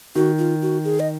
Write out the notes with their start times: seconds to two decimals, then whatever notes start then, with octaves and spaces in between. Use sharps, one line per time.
0.15 D#3 F#4
0.38 F4
0.62 F#4
0.85 G#4
1.00 D#5